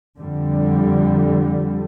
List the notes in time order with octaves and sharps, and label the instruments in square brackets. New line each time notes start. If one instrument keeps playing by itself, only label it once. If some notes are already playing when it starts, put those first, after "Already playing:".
[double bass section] F2 D3 G3